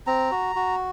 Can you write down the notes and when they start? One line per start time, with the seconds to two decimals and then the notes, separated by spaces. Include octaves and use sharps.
0.07 C4 A#5
0.31 F#4
0.56 F#4